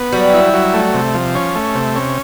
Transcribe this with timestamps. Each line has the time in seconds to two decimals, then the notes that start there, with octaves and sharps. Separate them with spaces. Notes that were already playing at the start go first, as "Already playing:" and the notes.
Already playing: B3
0.12 F#3 G3
0.33 E4
0.54 F#3
0.74 A3
0.94 C3
1.14 F3
1.35 C#4
1.55 A3
1.75 C3
1.96 C#4